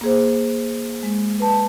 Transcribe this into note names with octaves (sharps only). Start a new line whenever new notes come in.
A#3 G#4 C5
G#3
B4 A5